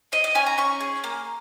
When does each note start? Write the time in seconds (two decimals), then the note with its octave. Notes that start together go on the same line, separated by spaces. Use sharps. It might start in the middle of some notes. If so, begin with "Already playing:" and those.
0.12 G#4 D#5
0.24 D#5
0.35 C#4 G#5
0.46 A#5
0.58 C#4 C#6
0.81 G#4
1.04 A#3